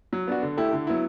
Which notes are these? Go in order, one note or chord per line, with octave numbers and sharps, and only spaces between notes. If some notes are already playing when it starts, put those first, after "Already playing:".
F#3
B3 D4 F#4
D3
A3 E4 G4
D3
F#3 B3 E4